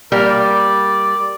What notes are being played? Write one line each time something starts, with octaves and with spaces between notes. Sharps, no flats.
G3 A#3 A#4
D5